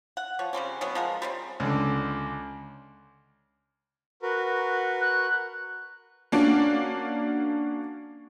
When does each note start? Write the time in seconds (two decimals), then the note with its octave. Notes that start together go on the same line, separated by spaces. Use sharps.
0.17 F#5
0.39 F3 C#5
0.53 C#3 G3 C4 C#4
0.81 B2 F#3 B3 C#4
0.95 F3 G#3 A#4
1.22 G3 C4 C#4
1.60 C#2 D3
4.22 F#4 A#4 B4
5.01 F#6
6.32 A#3 C#4 D4 F#4